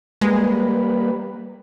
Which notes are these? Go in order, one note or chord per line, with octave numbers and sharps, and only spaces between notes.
G3 G#3 A#3 B4